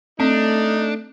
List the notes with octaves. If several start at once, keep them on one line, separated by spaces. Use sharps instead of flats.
A3 C4 D4 D#4